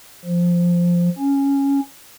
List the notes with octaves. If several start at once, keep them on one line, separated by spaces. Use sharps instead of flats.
F3
C#4